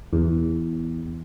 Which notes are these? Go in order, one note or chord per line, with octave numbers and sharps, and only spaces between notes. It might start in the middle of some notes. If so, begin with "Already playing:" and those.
E2